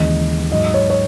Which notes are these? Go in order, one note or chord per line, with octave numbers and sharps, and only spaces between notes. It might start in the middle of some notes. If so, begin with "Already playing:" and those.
Already playing: D#2 C#3 E3 G#3 D#5
G#2 F#3 D#5
C#5
C#5